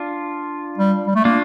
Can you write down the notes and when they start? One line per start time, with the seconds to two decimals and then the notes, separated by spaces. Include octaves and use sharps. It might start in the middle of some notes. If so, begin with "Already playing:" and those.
Already playing: D4 F4
0.78 G3
1.07 G3
1.15 A3
1.25 A#3 D4 F4